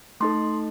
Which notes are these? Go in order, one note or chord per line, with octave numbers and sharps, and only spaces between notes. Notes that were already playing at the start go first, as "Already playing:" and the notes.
A3 D#4 A4 C6